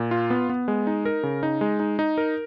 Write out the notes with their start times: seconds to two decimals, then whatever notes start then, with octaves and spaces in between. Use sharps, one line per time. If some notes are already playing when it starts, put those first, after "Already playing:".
Already playing: A#2
0.11 F4
0.30 B3
0.49 B3
0.68 G#3
0.87 D#4
1.05 A#4
1.23 C#3
1.43 D#4
1.61 G#3
1.80 D#4
1.99 D#4
2.18 A#4